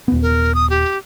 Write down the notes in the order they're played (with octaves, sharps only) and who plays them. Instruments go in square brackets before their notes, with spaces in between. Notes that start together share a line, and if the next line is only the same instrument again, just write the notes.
[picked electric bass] D#1 B3
[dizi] A#4
D#6
G4